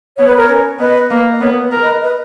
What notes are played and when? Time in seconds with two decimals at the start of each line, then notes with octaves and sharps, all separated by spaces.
0.18 B3 C#5
0.27 B4
0.37 A#4 C#5
0.49 C#4
0.79 B3 B4 D#5
1.10 A#3
1.30 D#5
1.41 B3 A#4 C#5
1.62 B4
1.71 A#4
1.82 B4 D#5
2.03 B4 D#5